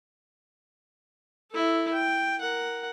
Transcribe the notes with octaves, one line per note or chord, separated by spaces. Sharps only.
E4 A4
G5
A#4 F#5